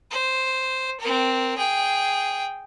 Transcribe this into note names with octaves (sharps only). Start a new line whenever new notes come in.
C5
C4 A#4
G#4 G5